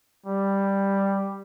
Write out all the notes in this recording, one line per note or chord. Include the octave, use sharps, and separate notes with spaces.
G3